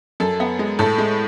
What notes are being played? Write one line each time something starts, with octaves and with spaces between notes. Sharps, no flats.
F#2 A4
B3
G#3
A2 A4
G#3